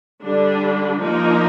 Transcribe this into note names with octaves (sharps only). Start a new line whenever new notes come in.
D3 G3 D4
F3 A#3 D#4 A#4